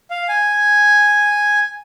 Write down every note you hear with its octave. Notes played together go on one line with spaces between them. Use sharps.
F5
G#5